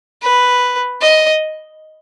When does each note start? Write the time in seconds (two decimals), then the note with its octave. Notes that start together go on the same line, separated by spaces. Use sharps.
0.22 B4
1.01 D#5